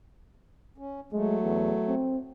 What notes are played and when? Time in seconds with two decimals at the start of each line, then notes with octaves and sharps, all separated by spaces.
0.78 C#4
1.13 F#3 G#3 A3
1.43 E2
1.88 C4